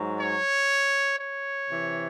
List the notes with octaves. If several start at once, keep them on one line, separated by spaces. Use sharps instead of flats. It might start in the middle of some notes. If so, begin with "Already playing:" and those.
Already playing: G#2 F#3
C#5
C#5
C3 E3